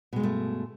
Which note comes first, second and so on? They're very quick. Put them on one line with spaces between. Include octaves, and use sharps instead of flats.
B2 G#3 G2 A3